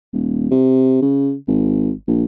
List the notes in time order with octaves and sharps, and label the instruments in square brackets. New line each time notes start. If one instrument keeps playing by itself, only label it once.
[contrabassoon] D#1
C3
C#3
G#1
A#1